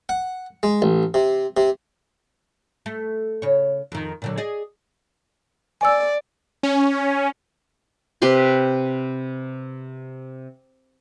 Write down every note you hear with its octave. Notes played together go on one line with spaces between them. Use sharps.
F#5
G#3
A1
C3
C3
A3
C#3 C#5
F2 D#3
A#2 D3 F#3
G#4 D5 D#5
D5 G#5 E6
C#4
C3 G4 B4 C6